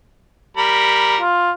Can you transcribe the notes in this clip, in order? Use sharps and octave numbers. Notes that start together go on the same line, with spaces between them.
G3 A#4 B5
F4